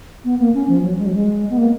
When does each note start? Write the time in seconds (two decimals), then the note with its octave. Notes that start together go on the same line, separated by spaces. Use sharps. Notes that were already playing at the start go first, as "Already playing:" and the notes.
0.25 B3
0.39 A#3
0.54 C#4
0.69 F3
0.83 F#3
0.99 G#3
1.06 F#3
1.15 G#3
1.50 B3
1.58 A#3